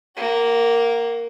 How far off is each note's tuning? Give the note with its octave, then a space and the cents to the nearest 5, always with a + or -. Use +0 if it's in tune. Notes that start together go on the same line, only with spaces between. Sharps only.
A#3 +0 F#4 +35